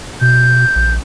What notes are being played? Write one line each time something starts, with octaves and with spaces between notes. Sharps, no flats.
B2 G6
A#1